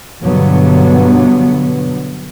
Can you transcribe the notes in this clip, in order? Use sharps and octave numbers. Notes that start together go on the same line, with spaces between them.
G2 B2 D3 F#3 B3